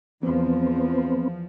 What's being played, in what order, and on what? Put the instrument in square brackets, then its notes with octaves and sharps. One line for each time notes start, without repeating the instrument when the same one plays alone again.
[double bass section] E2 F3 [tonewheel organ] B3 C4